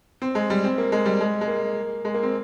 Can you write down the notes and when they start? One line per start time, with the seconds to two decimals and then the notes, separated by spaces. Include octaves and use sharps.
0.22 C4
0.35 G#3
0.50 G3
0.64 C4
0.78 A#3
0.92 G#3
1.06 G3
1.21 G#3
1.41 G#3
1.48 A#3
2.05 G#3
2.14 A#3
2.23 C4